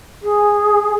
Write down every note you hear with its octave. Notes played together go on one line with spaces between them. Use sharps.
G#4